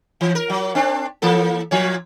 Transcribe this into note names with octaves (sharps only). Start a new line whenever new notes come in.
E3
A#4
F#3
C4 D4
E3 A#3 A4
A#2 F3 C#5